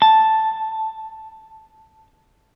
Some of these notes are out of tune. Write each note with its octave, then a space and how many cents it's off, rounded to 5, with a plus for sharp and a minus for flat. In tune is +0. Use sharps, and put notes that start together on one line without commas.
A5 +0